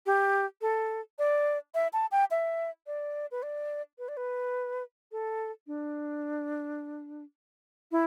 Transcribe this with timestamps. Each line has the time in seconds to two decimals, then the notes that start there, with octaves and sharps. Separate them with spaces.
0.06 G4
0.61 A4
1.19 D5
1.74 E5
1.93 A5
2.11 G5
2.31 E5
2.87 D5
3.31 B4
3.43 D5
3.99 B4
4.08 D5
4.17 B4
5.12 A4
5.67 D4
7.92 E4